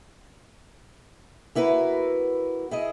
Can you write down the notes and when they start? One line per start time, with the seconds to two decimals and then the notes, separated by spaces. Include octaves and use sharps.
1.55 A#3 E4 F#4 B4
2.71 E4 G#4 D#5